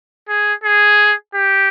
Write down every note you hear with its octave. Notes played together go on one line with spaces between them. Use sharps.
G#4
G#4
G4